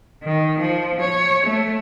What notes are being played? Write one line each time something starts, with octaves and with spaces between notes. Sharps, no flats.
D#3
F3
C#5
A3